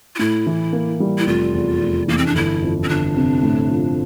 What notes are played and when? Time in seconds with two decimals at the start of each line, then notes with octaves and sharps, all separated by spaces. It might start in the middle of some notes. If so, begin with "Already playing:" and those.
0.16 F4
0.19 A2 E4
0.46 E3
0.73 A#3
1.00 G3
1.18 E4
1.27 F1 F4
1.54 E2
1.81 F1
2.08 E3 A#3
2.18 C4
2.26 D4
2.35 G1 E4
2.62 F2
2.83 C4
2.89 G1 D4
3.16 C3
3.43 A2
3.70 F3